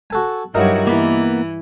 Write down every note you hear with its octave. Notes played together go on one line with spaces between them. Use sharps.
F#4 A4 G#5
G2 F#3 D#4 E4 F#4 A#4
E3 A#3 B3